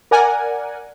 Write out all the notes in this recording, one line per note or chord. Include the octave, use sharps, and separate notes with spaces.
A#4 D5 F#5 G#5